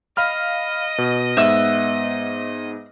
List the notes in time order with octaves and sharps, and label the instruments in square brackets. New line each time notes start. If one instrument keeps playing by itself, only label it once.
[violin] D#5 [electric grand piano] F5 B5 F6
[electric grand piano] B2
[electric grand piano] G#2 B3 [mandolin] E5 E6 F#6